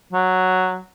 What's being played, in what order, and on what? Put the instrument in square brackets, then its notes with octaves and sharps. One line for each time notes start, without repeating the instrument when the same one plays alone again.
[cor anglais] F#3